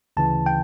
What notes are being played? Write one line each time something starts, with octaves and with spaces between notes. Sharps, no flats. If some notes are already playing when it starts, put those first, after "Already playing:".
D2 C#3 E3 A5
G5